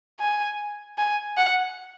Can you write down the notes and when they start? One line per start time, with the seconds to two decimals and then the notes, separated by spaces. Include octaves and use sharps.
0.20 G#5
0.98 G#5
1.37 F#5